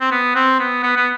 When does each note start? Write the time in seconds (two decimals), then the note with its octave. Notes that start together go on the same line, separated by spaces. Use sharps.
0.01 C4
0.11 B3
0.35 C4
0.59 B3
0.83 B3
0.97 B3